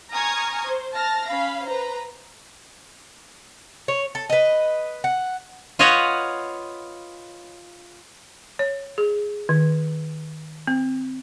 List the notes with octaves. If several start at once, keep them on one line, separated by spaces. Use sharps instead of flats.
G#5 A#5 C#6 D#6 F6 G#6
C5
A5 F6 A#6
C#4 F5 B5
B4 C5 A#5
C#5
A4
B4 D#5
F#5
F4 B4 C#5 D#5 F5 F#5
C#5
G#4
D#3
C4